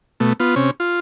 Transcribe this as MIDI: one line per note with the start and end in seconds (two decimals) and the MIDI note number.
0.20 0.33 47
0.20 0.33 57
0.40 0.55 59
0.40 0.55 65
0.56 0.71 48
0.56 0.71 61
0.80 1.00 65